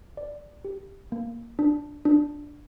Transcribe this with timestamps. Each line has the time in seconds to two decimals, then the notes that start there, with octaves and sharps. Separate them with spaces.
0.17 D5
0.65 G4
1.12 A#3
1.59 D4
2.05 D4